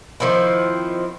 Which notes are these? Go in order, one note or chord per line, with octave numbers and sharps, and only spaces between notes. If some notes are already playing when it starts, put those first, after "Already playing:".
D#3 F3 C4 E4